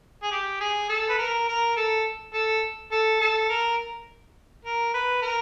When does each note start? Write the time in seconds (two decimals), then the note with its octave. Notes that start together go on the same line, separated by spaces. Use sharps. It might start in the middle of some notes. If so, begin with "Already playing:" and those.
0.23 G#4
0.31 G4
0.60 G#4
0.89 A4
1.09 B4
1.18 A#4
1.48 A#4
1.77 A4
2.33 A4
2.92 A4
3.21 A4
3.49 A#4
4.65 A#4
4.94 B4
5.22 A#4